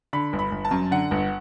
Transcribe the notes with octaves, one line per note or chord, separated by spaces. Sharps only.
D3 B5
G1
B5
G1
A5
F#2
D3 F#5
G1